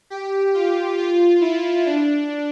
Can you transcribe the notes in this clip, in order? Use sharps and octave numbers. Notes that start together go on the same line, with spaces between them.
G4
F4
F4
E4
D4